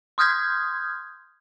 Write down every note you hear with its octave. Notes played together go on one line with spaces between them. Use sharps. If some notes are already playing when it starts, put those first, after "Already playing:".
C6 D#6 F6 G6 G#6